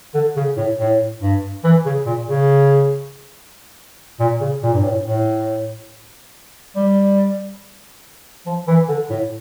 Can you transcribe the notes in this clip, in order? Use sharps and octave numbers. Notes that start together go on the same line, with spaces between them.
D3
C#3
A2
A2
G2
E3
C#3
A#2
C#3
A#2
C#3
A#2
G2
A2
A2
G3
F3
E3
D3
A2